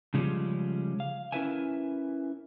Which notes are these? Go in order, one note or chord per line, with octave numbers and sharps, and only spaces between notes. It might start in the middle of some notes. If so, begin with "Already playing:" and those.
C#3 F3 G3 G#3 C#4
F5
C#4 E4 A#4 B4 E5 G#5